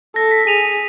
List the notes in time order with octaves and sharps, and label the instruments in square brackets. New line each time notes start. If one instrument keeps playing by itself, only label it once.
[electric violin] A4 [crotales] A#6
[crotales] B6
[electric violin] G#4 [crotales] D#7 F7